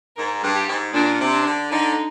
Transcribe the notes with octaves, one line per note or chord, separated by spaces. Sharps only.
G#2 A#4
G2
G4
G#2
A#2 D4
C3
D4
D3
D3 D#4